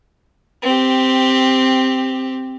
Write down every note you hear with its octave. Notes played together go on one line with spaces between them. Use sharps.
C4 G4